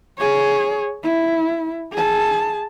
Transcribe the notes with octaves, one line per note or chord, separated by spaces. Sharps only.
G#4 C#5
E4
G#4 A5